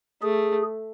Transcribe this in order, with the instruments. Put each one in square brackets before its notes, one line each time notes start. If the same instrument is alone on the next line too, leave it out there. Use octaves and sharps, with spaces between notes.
[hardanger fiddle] A3 [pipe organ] G#4